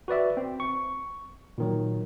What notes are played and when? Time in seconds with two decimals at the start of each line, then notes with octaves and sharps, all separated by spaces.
0.08 F#4 B4 D5 E5
0.37 C4
0.60 C#6
1.58 A#2 D#3 F#3